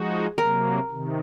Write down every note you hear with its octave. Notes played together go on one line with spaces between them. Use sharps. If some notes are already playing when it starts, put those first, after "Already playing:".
Already playing: F3 G#3 D#4 F#4 G#4
C3 F#3 A#3 A#4
C3 D#3